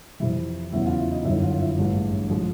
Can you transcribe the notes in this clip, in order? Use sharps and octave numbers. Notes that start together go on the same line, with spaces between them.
F2 C3 E3 E4 E5
E2 C#3 F#3 E4 E5
F4 F5
E4 E5
D#4 D#5
G1 F#2 D#3 F#3 E4 E5
F4 F5
E4 E5
A1 G2 E3 G#3
F3 G#3